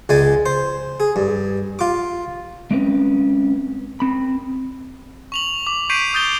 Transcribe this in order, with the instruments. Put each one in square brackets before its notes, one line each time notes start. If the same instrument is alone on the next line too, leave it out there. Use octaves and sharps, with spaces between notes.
[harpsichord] C#2 G#3 D5 G#5
C5
G#4
G2
F4 D6
[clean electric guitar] G#3 C4 C#4 B4
C4 B5
[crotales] C#6 F7 F#7
D6
C#6 G6 B6 C7 D7 D#7
C#6 D#6 G6 A6 G7